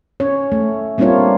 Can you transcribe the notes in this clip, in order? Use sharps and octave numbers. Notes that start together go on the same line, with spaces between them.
C#4 C#5
A3
G3 A#3 C4 D4 F4 C#5